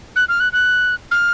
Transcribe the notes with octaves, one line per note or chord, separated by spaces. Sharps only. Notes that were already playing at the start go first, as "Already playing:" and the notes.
F#6
F6
F#6
F#6
F6